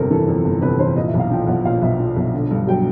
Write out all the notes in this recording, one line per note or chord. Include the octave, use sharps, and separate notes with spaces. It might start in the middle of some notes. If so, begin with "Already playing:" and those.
Already playing: G1 F2 C3 A4 A#4
E3 A4
F2
G1
C3 B4
E3 C5
A#2 D#5
E5
B1
F5
F3 G5
B1 F#5
A#2 F5
B1 E5
F3
B1
D3
G2
F#3 G5